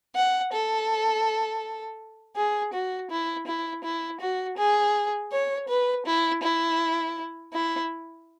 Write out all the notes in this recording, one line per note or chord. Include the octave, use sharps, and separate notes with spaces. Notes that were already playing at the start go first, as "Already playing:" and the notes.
F#5
A4
G#4
F#4
E4
E4
E4
F#4
G#4
C#5
B4
E4
E4
E4